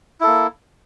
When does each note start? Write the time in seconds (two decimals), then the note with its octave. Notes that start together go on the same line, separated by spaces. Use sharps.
0.20 E4
0.24 A4
0.27 A#3